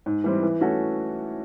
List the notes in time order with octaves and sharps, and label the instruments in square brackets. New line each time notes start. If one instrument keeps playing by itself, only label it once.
[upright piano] G#2
E3 G3 C4
E3
A3 C#4 F#4 A4